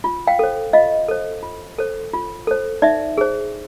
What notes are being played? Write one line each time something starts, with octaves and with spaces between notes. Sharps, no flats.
F4
F5 G5
A4 C5
F4 D#5 F5
A4 C5
F4
A4 C5
F4
A4 C5
D#4 D5 E5
G#4 C5